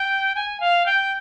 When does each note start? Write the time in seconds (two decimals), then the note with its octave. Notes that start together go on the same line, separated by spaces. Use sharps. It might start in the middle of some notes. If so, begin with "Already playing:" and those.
Already playing: G5
0.35 G#5
0.60 F5
0.86 G5